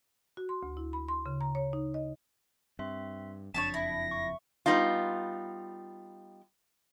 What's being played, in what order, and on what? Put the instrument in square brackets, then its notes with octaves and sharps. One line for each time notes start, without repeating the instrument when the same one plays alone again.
[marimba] F#4
C6
D2
E4
B5
C6
C#3
A#5
C#5
D#4
D#5
[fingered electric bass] G2 [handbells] C4 E5 C6
[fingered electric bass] F#1 F2 [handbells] D4 B6 [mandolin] C#5 D5 A5 [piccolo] E7
[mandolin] E4 [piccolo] A#6
[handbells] C#6
[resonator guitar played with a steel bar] G3 B3 D#4 F4